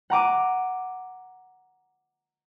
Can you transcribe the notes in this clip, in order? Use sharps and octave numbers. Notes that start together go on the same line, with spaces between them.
F#5 A#5 D6 D#7